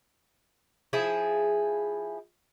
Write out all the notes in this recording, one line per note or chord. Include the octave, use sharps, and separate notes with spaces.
F3 E4 G#4